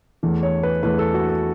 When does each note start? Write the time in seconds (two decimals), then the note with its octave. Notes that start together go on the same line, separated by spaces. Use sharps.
0.23 E2 E3 A3
0.43 C#5
0.63 B4
0.83 E2 E3 A3 B4
0.99 A4
1.14 F#4
1.29 A4